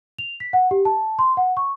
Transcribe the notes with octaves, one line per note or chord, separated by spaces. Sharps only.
F7
B6
F#5
G4
A5
C6
F#5
C#6